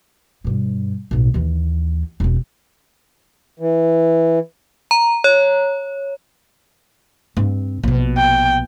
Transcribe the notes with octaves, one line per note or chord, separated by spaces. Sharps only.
G2 B2
B1 A2
D#2 E3
E1 C4
E3
A#5
C#5
G2 C4
A#1 B2
G5